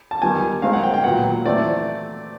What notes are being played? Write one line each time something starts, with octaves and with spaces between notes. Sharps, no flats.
A5
D#3 G3 B3 G#5
D#3 G#3 C4 F5
F#5
G5
G5
A#2 F#3 B3 F#5
E3 A3 C4 D5